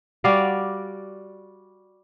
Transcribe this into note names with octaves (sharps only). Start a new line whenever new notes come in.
G3 F#4 D5 F5